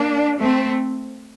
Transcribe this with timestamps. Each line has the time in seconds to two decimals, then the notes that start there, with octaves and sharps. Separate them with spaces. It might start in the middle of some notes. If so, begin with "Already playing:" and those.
Already playing: A#3 D4
0.40 A3 C4